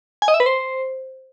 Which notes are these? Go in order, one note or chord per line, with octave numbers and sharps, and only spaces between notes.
G#5
D#5
E5
B4
C5